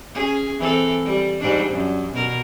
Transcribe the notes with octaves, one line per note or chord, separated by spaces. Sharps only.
C#4 G#4
E3 C4 A4
G3
G#2 G3 D4
F#2
B2 A#4